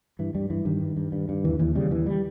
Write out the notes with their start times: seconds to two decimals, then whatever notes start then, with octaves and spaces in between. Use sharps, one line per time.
0.19 G2 E3
0.35 G2 G3
0.50 G2 E3
0.65 G2 D#3
0.81 G2
0.97 G2
1.12 G2
1.29 G2
1.44 D#2 E3
1.59 D#2 E3
1.75 C#3 G3
1.91 D#2 E3
2.06 G3